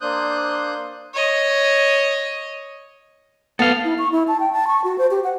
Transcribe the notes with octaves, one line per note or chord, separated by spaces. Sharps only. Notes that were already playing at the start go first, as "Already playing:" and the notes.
A#3 D4 C5 D#6 F#6 G6
C#5 D#5
B3 A4 F5
E4
C#6
E4
A5
G5
A5
C#6
F#4
C5
G4
F#5